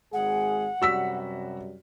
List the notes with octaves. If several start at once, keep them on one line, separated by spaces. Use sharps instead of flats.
G#1 G#3 G#4 F#5
F#2 C3 G3 F#4 E6 B6